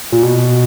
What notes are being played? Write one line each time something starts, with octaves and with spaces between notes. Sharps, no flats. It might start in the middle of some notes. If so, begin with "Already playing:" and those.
A#2
B2